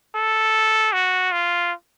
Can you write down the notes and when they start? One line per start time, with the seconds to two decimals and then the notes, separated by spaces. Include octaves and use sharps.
0.15 A4
0.93 F#4
1.32 F4